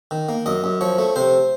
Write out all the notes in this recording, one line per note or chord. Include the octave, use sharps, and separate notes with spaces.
D#3
A#3
F#2 D#5
F#2
F3 C#5
A3
C3 C5